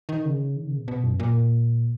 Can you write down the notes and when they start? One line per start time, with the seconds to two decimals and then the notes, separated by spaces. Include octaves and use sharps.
0.09 D#3
0.25 C#3
0.56 D#3
0.67 C#3
0.78 B2
0.88 B2
1.04 F#2
1.20 A#2